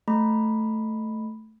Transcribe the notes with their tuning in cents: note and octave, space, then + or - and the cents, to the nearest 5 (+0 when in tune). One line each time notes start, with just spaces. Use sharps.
A3 +0 B5 +0